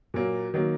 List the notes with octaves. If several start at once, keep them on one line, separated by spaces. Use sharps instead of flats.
A#2 F#3 A#3
D#3 F#3 A#3